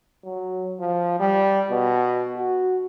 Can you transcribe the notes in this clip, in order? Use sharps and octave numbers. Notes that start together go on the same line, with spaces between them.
F#3
F3
G3
B2
F#4